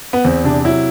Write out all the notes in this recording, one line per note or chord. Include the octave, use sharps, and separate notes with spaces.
B3
E2 C4
C3 D4
F#3 E4